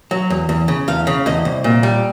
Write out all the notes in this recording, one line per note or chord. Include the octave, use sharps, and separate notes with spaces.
F#3
E2
E2
C#3
E2 F5
C#3
E2 D#5
C2
A#2
G3